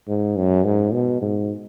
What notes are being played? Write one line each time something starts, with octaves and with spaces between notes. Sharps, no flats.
G#2
F#2
G#2
B2
G#2